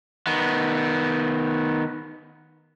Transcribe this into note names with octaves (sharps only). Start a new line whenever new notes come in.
D#3 B3